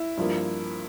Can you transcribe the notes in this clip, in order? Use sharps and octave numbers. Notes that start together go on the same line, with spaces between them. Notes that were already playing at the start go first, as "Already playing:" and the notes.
Already playing: E4
G2 F3 A#3